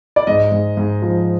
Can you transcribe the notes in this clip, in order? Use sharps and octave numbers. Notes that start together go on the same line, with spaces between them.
D5
G#2 D#5
G#2
G#2
F3